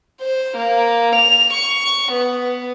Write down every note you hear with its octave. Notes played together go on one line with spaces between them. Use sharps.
C5
A#3
F7
C#6
B3